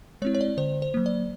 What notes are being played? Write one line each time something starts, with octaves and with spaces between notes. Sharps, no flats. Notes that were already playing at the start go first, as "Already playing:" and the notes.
G#3 C4 E4 C#5
C#5
D5
D3 C5
C5
F#3 A#3
D5